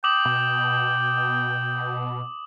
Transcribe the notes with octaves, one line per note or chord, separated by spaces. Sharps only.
G5 D6 D#6 F#7
B2